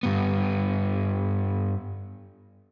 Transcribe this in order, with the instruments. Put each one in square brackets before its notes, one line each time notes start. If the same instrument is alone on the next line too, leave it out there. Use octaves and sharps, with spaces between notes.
[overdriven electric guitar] G2 B3